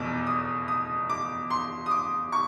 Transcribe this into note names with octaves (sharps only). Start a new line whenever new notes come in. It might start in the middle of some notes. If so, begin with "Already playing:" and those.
Already playing: F1 E2 B2 D6
D#6
D#6
D6
C6
D#6
D6
C#6